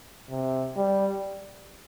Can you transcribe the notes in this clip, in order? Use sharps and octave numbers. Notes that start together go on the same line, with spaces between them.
C3
G3